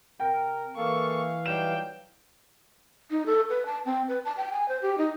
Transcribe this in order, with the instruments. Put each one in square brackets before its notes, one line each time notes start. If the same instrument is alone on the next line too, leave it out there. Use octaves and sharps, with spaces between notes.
[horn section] C3 A#4 [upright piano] G5
[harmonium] E3 F5 [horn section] A#3 A4 [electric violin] C#6
[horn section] F#3 G3 D#4 [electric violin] G5 [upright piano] E7
[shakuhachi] D#4
A4
B4
A5
C4
B4
A5
G5
G#5
C5
G4
D#4